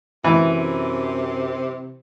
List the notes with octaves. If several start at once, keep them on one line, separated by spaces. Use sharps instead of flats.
F#2 C3 E3